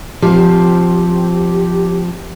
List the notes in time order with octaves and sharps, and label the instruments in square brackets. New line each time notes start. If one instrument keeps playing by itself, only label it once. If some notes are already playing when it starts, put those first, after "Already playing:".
[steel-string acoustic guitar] F3 C4 [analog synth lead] G4